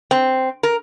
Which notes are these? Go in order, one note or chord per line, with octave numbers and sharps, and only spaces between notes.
C4
A#4